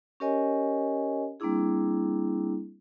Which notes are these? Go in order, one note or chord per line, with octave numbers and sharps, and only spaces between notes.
C#4 G4 A#4 C#5 D#5 G#5
G3 A#3 C4 D4 E4 G#4